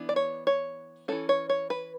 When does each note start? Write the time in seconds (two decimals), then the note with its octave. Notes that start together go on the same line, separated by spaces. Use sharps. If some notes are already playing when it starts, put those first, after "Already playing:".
Already playing: E3 B3 D4
0.09 D5
0.16 C#5
0.47 C#5
1.08 E3 A3 C#4 A4
1.29 C#5
1.49 C#5
1.70 B4